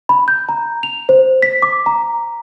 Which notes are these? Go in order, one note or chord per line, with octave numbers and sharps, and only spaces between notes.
B5
G6
A#5
F7
C5
B6
D6
A#5